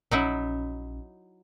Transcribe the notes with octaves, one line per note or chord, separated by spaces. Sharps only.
A#1 F#3 C#4 D#4 E4